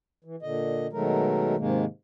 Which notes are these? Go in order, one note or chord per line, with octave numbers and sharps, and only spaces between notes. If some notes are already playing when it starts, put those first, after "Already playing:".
E3
A#2 D3 D#5
B2 D#3 F#3 G#3 A3 A#4
G#2 C3 D#3 G#3 A#3